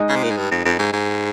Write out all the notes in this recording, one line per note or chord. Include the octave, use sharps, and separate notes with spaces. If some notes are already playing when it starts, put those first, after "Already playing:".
Already playing: G#3 D#4 G#4 D#5
C#3
C3
A#2
G#2
G2
F2
F2
G#2
G#2